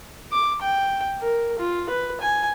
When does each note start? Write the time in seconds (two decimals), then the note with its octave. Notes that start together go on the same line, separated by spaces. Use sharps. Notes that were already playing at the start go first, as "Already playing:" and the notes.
0.32 D6
0.62 G5
1.21 A#4
1.58 F4
1.89 B4
2.21 G#5